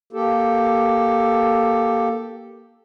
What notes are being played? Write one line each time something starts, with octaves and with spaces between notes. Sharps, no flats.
A#3 G4 A4